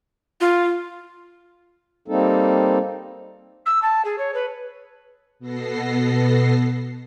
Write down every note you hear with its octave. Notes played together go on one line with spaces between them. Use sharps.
F4
G3 A#3 C4 D#4 A4
E6
A5
G#4
C#5
B4
B2 B3 A4 A#6 C7